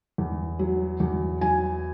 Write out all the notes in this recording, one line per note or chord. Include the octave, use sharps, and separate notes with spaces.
E2
F#3
E2
F#3 G#5